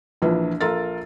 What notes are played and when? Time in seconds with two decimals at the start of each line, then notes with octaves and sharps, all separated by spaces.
0.22 A#1 E3 F3 D4
0.61 A#1 F4 A4 A#4 A6